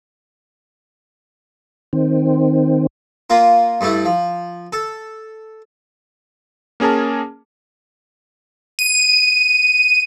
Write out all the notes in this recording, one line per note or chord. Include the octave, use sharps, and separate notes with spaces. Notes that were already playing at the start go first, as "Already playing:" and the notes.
D#3 C4
A#3 F4 A#4
G2 G3 A3 E4
F3
A4
A#3 C#4 G#4 A#4 A5
D#7